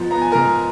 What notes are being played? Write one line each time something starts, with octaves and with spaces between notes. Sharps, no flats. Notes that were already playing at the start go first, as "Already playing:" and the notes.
Already playing: G#2 F3 B3
B3 A#5
G#5
G#2 A#4 A#5